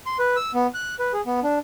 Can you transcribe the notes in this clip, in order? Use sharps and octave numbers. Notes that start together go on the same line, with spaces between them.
C6
B4
E6
B3
F#6
B4
G#4
B3
D4